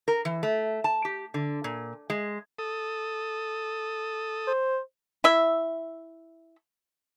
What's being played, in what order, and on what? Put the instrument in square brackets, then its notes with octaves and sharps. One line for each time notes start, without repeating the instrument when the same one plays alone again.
[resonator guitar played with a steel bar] A#4
E3
A3
A5
G4
D3
A#2
G#3
[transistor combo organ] A4 D#6
[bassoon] C5
[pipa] E4 E5